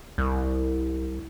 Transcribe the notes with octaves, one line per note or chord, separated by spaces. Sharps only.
C2